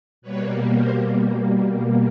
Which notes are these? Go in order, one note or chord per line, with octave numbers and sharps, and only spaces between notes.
B2 G3 A#3 B4 C#5
A#4 C5